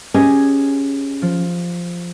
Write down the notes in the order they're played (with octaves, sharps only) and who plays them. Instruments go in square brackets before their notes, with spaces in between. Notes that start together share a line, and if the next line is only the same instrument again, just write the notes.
[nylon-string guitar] C#4 [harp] G4 G#4 D#5
[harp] F3